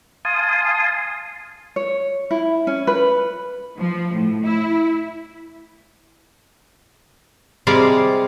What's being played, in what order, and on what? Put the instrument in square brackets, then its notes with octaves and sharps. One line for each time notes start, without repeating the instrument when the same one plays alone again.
[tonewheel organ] F5 G#5 A5 C6 D#6
[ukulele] C#5
E4
C#4
B4
[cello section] F3
A2
E4
[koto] C3 G3 G#3 D5 F5